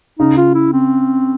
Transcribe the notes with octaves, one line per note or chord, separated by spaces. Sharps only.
C#3 D#4
F4
E4
C4